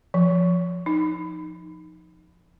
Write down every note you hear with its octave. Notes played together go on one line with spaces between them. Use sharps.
F3
D#4